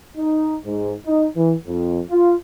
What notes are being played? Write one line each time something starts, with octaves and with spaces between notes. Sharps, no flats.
D#4
G#2
D#4
E3
F2
F4